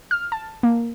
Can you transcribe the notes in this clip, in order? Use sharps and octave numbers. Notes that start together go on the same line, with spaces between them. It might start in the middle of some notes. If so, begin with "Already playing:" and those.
F6
A5
A#3